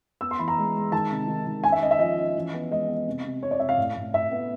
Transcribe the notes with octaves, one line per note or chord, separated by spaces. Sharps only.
B3 E6
C6
E3 B5
A#5
G#3
G#3
D#3 A5
C3
D#3
D#3
C#4 G#5
E5
C#4 D#5
E5
F3 D#5
C#4
E3
B3
G#3 D#5
B3
C3
C3
C3 C#5
D5
C3 E5
F5
A2
A2
A2 E5
B3